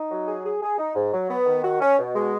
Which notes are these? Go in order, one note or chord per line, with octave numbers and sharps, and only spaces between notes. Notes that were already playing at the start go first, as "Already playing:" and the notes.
Already playing: D#4
F#3
G#4
G#4
G#4
D#4
G#2
F#3
B3
D#3
F#4
C#4
B2
G#3